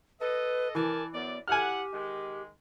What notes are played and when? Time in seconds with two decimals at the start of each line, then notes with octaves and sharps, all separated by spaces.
0.20 A4 B4 D#5
0.75 E3 A#4 D5 G#5 A5
1.13 F#2 B3 D5
1.48 E4 G4 F#5 G#5 F6
1.93 D#3 G#3